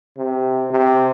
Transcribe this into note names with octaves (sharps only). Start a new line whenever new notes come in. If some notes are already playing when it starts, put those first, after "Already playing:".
C3
C3